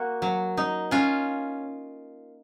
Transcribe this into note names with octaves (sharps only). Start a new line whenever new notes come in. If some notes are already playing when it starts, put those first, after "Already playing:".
Already playing: A#3 F#4
F#3
D#4
C#4 F4